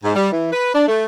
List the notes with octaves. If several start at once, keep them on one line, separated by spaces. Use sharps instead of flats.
G#2
G3
E3
B4
D4
A3